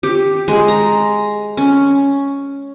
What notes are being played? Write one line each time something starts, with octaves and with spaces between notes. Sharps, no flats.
G4
G#3
A#5
C#4